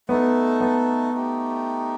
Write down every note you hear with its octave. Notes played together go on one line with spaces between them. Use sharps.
A3 B3 D#4 A4
B3
A3 D#4 G4